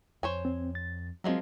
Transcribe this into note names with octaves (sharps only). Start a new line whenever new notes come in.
F2 C5 C#5 G#5
C4
A6
F3 F#3 G#3 C4 A#4